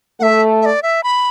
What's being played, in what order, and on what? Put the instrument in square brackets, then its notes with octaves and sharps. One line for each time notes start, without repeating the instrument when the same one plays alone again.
[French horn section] A3 [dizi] E5 F#5
[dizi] E5
D5
E5
B5